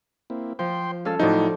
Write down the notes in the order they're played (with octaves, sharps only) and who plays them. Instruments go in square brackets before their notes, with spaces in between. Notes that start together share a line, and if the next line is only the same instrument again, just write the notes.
[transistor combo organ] A#3 C4 E4
[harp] F3 [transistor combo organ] C5 G5 C6
[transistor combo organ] F3 G#3 F5 [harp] C#4 A4 F6
[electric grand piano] A2 D#4 [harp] F3 F#4 D5 [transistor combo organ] F#3 E4